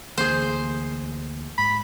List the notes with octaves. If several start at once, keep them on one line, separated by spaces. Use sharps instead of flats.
D2 E3 A#3 G#4 C5
G#2 B5